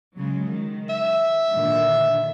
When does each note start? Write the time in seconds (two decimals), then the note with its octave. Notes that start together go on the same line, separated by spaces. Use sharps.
0.16 C#3 F#3 G#3
0.47 D#3
0.89 E5
1.53 A#2 D3 D#3